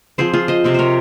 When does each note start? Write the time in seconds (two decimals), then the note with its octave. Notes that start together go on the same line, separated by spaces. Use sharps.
0.18 F3 C4 G#4 C5
0.33 F4 G#4
0.48 C5 D#5
0.64 C3 F3 C4
0.74 A#4 C5 C#5